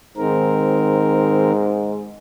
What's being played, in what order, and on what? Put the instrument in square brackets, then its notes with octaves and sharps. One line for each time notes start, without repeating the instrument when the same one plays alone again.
[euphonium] G#2 [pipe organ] D#3 C4 A#4